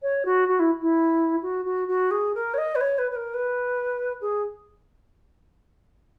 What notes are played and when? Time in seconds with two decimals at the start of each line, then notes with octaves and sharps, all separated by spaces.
0.02 C#5
0.25 F#4
0.48 F#4
0.59 E4
0.81 E4
1.42 F#4
1.65 F#4
1.87 F#4
2.10 G#4
2.34 A#4
2.53 C#5
2.57 D#5
2.75 B4
2.80 C#5
2.98 B4
3.11 B4
3.15 A#4
3.33 B4
4.21 G#4